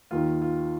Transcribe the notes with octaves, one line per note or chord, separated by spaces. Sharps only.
D#2 D#3 F4
F4